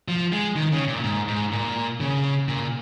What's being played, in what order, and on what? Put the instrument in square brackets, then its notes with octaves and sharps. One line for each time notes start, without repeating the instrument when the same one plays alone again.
[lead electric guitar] F3
G#3
D#3
C#3
A#2
G#2
G#2
A#2
C#3
A#2